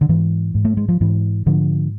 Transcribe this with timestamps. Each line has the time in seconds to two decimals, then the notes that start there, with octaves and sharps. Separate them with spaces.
0.01 D3
0.09 G#2 E3
0.55 G#2
0.65 A3
0.77 G#3
0.88 F3
1.01 G#2 E3
1.46 G#2 D3 F3